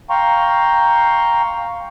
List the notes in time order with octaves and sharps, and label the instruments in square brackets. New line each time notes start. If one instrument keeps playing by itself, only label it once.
[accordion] F5 G5 A#5 C6 C#6